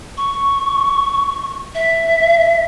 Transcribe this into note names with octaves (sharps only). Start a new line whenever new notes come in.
C#6
E5